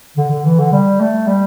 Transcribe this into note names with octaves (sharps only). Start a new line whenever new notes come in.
D3
D3
E3
D3
G3
A3
G3